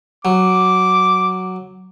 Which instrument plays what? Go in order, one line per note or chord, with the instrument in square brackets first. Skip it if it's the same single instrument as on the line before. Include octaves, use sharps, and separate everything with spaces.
[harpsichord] F#3 [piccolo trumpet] D6